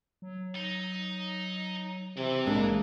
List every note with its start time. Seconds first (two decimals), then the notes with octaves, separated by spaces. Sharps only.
0.22 F#3
0.55 D#4
2.17 C3 E3
2.46 B1 G#3 A#3 D4